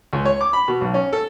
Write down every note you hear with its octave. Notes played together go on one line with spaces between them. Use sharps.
C#2
C#5
D6
B5
B2
B1
C#4
A4